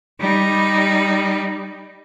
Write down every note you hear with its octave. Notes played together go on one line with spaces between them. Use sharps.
G3 D#4